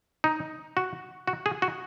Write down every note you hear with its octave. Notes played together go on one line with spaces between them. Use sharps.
D#4
F#4
F#4
G#4
F#4